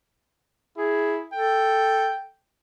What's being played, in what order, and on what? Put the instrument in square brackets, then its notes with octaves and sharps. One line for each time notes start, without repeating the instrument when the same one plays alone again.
[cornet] E4 [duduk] G#4
[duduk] A4 [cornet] G5